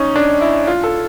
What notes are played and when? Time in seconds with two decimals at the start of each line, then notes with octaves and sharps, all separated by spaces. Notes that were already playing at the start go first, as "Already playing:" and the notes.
Already playing: C#4 D#4
0.16 D4
0.41 E4
0.67 F4
0.84 A4